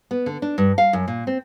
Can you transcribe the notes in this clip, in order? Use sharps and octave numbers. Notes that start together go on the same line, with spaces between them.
B3
D3
D4
G2
F5
F#2
A#2
C4